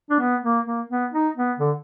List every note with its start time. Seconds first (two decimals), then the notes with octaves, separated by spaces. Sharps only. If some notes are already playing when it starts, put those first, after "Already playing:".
0.10 D4
0.20 B3
0.44 A#3
0.66 A#3
0.90 B3
1.13 D#4
1.36 B3
1.59 D3